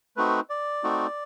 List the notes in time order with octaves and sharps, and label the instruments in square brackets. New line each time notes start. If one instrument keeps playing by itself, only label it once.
[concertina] A3 C4 D#4 F#4 B4
D5
A3 C4 D#4 F#4